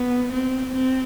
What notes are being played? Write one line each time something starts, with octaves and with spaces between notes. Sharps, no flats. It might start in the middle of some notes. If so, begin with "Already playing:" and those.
Already playing: B3
C4
C4